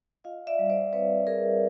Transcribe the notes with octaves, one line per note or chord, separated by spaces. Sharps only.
F4 D#5 F5
D5 E5
G3
C5 D5
C4 B4 C#5
G3 G#4 A#4